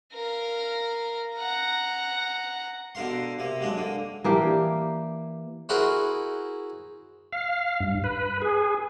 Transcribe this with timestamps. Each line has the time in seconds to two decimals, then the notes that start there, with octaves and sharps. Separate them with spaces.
0.13 A#4 F5
1.35 F#5 A#5
2.95 B2 D3 A#4 F5 C6
3.39 C3 A#3
3.61 F#3 G#3 D4
3.76 D3 A#3
4.24 E3 A#3 D4 G4
5.69 E4 F#4 G#4 A#4 C5
7.33 F5
7.80 G2
8.04 B4
8.42 G#4